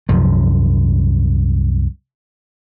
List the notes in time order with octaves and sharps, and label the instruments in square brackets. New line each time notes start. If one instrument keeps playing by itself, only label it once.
[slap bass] C2 F#2 F3